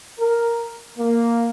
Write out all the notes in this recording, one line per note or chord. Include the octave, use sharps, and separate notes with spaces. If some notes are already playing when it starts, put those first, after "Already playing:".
A#4
A#3